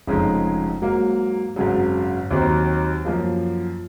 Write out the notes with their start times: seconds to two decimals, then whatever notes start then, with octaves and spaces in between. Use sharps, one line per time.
0.07 F1 F2 C#3 G#3 D#4
0.81 G#2 F#3 A#3
1.56 G#1 F#2 C#3 F#3
2.31 D#2 D#3 F#3 C4 D#4
3.05 F#2 F3 A#3